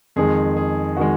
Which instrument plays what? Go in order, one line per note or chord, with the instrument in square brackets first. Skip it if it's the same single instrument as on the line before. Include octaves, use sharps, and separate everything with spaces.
[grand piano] F2 D#3 G#3 G#4
G#4
D#3 G#3 F#4